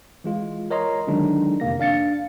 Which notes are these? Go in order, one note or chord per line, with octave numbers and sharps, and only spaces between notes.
E3 G#3 F4
A#4 C#5 D#5 A#5 C6
D3 D#3 F#3 G#3 D4 D#4
F2 C3 A#3 A#6
D4 F5 A6 C#7